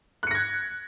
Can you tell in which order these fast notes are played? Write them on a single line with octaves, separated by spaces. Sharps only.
F#6 C#7 A#6 G#6